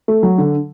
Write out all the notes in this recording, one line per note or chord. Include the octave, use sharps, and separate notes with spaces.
A3
F#3
D3